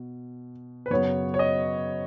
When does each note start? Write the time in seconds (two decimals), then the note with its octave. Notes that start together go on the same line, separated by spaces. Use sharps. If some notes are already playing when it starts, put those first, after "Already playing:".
Already playing: B2
0.86 B4
0.90 F#2 C#3 F#3 B3 C#5
1.34 C#5
1.39 D#5